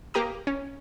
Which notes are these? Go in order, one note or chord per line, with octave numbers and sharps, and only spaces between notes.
A#3 G4 A#5 D#6
C#4